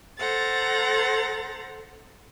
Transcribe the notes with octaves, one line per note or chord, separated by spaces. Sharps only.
A4 C5 F#5 A#5 A6